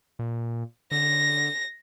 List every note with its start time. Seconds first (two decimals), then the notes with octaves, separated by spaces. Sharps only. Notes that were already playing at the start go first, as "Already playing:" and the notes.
0.19 A#2
0.91 D3 A#6